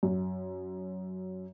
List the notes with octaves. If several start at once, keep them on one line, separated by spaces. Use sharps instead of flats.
F#2